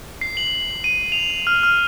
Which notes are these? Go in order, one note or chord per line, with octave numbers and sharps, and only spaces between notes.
C7
F#7
D#7
F7
F6
F6